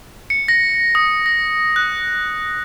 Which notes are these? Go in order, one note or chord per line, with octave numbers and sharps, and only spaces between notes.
C#7
A#6
D#6
A#6
F#6